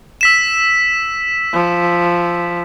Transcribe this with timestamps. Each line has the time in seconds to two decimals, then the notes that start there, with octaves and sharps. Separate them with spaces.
0.21 E6 B6 E7
1.54 F3